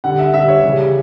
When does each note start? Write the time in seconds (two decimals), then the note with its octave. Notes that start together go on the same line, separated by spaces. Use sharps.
0.04 D3 G3 F#5
0.19 E5
0.34 D3 G3 E5
0.48 C#5
0.64 C#3 E3 G3